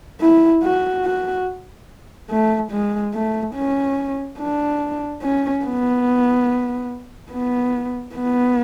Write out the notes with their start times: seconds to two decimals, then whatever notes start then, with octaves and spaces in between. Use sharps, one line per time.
0.21 E4
0.63 F#4
1.05 F#4
2.31 A3
2.71 G#3
3.14 A3
3.55 C#4
4.39 D4
5.22 C#4
5.65 B3
7.31 B3
8.15 B3